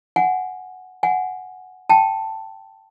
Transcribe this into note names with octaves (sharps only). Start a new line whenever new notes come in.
F#5 G#5
F#5 G#5
G5 A5